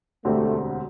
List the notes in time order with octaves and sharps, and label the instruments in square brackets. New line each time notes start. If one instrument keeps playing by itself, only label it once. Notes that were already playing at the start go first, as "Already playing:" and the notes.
[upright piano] E1 D2 D3 C4 G4 [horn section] A3